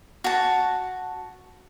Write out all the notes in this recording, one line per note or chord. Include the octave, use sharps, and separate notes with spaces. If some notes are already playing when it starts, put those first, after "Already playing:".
F#4 A5